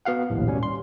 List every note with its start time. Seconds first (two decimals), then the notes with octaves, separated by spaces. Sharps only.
0.05 B3 F#4 F5 F#5
0.30 A#1 D#2 A2
0.47 B2 G3 C#4
0.63 C6